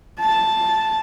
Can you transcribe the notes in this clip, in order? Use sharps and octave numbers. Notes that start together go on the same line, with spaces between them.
A5